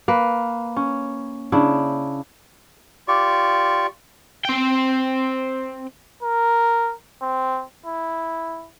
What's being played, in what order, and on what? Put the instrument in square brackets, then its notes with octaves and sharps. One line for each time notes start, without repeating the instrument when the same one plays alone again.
[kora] A#3 B4
C#4
C#3 D4 E4
[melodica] F4 G4 D5 C#6
[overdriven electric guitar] C4 G5
[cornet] A#4
C4
E4